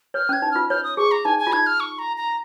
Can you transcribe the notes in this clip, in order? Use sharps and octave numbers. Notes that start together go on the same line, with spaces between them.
C#5 F6
C#4 G#6
D#4
F4 F6
C#5 F6
D#6
G#4 C#6
A#5
D#4 G#5
G#5
F4
D#4 G#6
F6
C#6
A#5
A#5